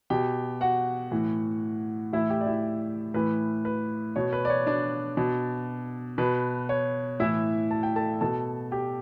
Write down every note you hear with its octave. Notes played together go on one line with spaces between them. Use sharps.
B2 G4 G5
F#4 F#5
A2 E3
A2 E3 E4 E5
G4 G5
D5
E4 E5
A2 E3 B4
B4
B2 C#5
B4
D5
C#5
D4 D5
B2
B2 B4
C#5
A2 E3 E4 E5
A5
G5
A4 A5
B2 A4 A5
G4 G5